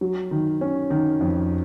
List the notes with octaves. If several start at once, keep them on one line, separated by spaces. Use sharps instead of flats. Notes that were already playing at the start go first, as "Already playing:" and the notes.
F#3
D#3
C#4
D#3
F2